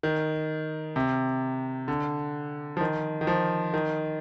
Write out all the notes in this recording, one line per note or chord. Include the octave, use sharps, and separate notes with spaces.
D#3
C3
D3
F3
D#3
D#3
F3
D#3